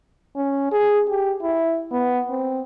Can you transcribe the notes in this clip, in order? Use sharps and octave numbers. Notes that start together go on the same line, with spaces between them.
C#4
G#4
G4
E4
B3
C4